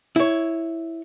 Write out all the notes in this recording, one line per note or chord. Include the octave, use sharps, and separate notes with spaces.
E4 C#5